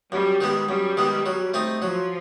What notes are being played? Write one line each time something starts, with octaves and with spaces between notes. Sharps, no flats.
F#2 G3
D#3 G#3 B3
F#2 G3
D#3 G#3 B3
F#3
A3 C4 D#4
F3 F#3